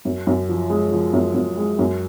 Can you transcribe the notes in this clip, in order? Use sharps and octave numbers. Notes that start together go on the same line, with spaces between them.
F#2
F#2
F3
G#3
F3
F#2
F#2
G#3
F#2